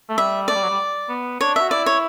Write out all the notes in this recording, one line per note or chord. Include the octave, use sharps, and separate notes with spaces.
A3
G3 E5
A3 D5
G3
F#3
G3
B3
D4 C#5
F#4 E5
E4 D5
C#5